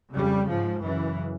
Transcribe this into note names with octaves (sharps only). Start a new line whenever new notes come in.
F2 C#3 G3
G#2 F3
F#2 C#3 E3